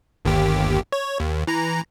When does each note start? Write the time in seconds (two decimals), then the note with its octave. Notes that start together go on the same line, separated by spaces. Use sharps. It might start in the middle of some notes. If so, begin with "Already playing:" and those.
0.25 G1 D#2 G4
0.92 C#5
1.20 D#2
1.47 E3 A#5